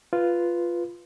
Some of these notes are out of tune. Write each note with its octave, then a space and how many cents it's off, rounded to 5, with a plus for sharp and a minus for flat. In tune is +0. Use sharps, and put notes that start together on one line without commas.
F4 -5 B4 +0